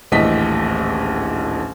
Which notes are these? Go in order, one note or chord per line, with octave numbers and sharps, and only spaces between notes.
D#1 A#1 A2 E3 D#5 B6